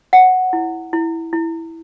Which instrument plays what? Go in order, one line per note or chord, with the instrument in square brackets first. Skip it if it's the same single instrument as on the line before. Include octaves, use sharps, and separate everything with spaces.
[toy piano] C#5 F#5
E4
E4
E4